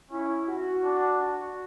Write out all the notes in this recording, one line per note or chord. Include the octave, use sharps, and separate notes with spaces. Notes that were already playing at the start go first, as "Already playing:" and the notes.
C#4 E4
F#4
D4
F#4